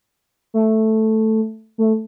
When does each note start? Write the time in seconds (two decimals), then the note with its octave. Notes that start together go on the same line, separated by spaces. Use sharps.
0.54 A3
1.78 A3